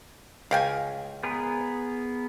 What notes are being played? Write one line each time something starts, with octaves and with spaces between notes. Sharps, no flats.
C#2 F5 G5 G#5
B3 G#4 A#4